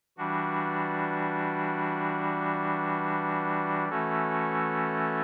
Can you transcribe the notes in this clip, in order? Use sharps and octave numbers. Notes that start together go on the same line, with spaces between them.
E3 G3 D4 F#4
E3 A3 C#4 F#4 A4